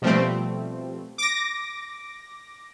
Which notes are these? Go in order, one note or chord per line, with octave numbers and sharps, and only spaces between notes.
B2 F3 G3 A3 C4
D6 A#6